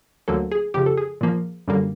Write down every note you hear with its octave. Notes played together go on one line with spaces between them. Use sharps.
D2 D3 F#3 A#3 A4
G#4
F2 C#3 F3 G4
A4
G#4
A#2 F3 A#3
F#2 D3 G3 A#3